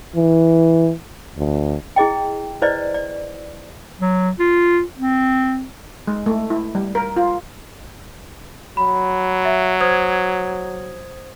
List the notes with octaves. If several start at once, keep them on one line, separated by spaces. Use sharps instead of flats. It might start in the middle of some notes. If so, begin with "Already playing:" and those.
E3
D2
E4 G#4 D#5 G5
E4 B4 C5 D5 D#5
D5
F#3
F4
C4
G#3
A3
E4
G3
A#4
F4
F#3 B5
E5
C5 D#6 G#6